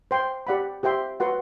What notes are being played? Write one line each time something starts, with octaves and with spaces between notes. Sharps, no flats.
C5 G5 C6
G4 D5 F#5 B5
G4 C5 E5 G5 C6
F#4 B4 F#5 C6